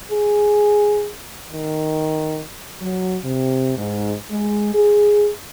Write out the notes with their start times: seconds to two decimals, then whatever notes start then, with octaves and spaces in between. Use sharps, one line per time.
0.12 G#4
1.53 D#3
2.81 F#3
3.24 C3
3.77 G#2
4.31 G#3
4.74 G#4